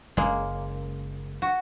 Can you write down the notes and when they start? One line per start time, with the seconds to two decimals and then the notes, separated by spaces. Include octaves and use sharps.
0.17 F#1 C#3 G#3 A#3
1.42 F#4